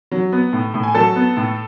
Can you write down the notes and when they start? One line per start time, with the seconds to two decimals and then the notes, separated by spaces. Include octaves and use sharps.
0.11 F#3
0.32 B3
0.53 A2
0.74 A2
0.83 G#5
0.95 F#3 A4 A5
1.16 B3
1.37 A2